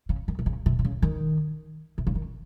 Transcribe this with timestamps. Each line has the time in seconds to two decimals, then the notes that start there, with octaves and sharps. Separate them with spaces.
0.09 C#3
0.28 D#3
0.39 C3
0.46 C#3
0.66 C3
0.79 C3
0.85 C#3
1.02 D#3
1.98 C3
2.07 C#3
2.15 D#3